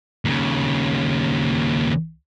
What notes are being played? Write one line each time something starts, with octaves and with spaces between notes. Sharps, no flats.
D#2 C#3